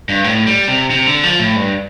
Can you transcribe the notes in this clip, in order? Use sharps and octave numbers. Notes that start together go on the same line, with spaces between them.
G2
A2
G3
C3
C3
D3
F3
A2
G2